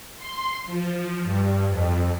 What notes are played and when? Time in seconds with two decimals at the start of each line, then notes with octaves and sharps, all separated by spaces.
0.17 C6
0.66 F3
1.23 G2
1.68 F2